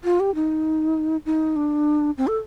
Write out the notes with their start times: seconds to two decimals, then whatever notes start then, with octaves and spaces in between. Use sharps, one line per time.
0.04 F4
0.20 G4
0.35 D#4
1.26 D#4
1.56 D4
2.18 C4
2.27 A4